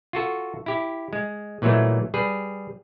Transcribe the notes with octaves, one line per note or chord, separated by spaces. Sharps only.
F4 F#4 A4
E4 G4
G#3
A#2 E3 F#3 G#3 A3
G3 G#4 B4